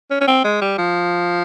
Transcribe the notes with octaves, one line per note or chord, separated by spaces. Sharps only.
C#4
C#4
C4
G#3
G3
F3